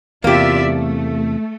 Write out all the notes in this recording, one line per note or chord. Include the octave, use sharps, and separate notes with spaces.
E2 C3 A#3 F4 G4 D5 E5
A3